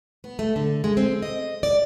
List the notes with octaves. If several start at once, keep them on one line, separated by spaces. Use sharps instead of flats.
B3
A3
D3
G#3
C4
D#5
D5